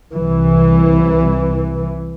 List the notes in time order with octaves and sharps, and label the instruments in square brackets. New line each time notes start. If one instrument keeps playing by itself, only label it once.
[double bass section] C2 E3